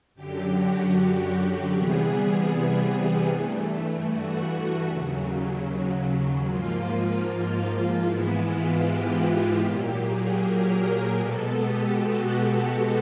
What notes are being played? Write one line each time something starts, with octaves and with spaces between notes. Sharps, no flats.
F#2 D3 F#3 G4
F#4
G4
C3 E3 G3 B3 G#4
G2 E3 A3
F#4
D#2 C#3 F#3
G#2 F3 A#3 F4
F4
F4
G#2 E3 G#3 B3 E4
F4
G4
G4
A#2 F#3 A#3 G4
G#4
A#4
B2 G#3 B3 A4
G4
F#4
G4